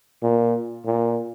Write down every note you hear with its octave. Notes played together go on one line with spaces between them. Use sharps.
A#2
A#2